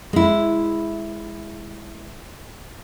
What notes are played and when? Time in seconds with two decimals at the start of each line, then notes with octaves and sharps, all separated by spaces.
0.13 G#3 E4